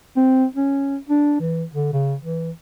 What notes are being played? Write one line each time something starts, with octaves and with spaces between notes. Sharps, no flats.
C4
C#4
D4
E3
D3
C#3
E3